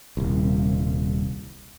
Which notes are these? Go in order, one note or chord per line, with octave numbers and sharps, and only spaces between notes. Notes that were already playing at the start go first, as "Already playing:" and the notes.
D#1 C2